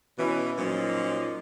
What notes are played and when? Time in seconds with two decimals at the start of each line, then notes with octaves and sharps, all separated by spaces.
0.17 B2 E3 C#4
0.57 F#2 A#2 F3 F#3 C#4 D#4